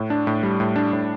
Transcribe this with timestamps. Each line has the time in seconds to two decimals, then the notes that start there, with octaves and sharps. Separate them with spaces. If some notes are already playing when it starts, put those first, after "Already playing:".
Already playing: A2
0.10 D4
0.27 A2
0.43 G3
0.60 A2
0.76 D4
0.93 A2